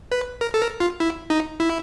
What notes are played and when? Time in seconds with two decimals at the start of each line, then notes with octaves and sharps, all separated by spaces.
0.12 B4
0.41 A#4
0.54 A4
0.61 A#4
0.80 F4
1.00 E4
1.30 D#4
1.60 E4